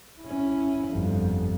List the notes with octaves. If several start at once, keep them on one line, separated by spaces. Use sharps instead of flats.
C#4 E4
G1 F2